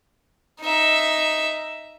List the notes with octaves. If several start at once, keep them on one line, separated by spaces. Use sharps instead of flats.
D#4 E5